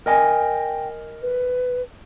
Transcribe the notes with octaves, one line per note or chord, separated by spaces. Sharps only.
A#4 D#5 G5 G#5
B4